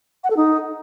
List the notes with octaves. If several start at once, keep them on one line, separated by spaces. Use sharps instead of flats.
F#5
A4
D#4